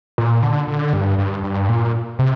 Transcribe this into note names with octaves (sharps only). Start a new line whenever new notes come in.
A#2
D3
D3
G2
G2
G2
A#2
C3